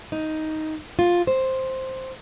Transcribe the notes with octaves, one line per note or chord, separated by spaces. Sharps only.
D#4
F4
C5